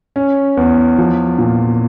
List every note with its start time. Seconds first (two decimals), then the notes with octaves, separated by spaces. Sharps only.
0.16 C#4
0.57 E2
0.98 F3
1.39 A#2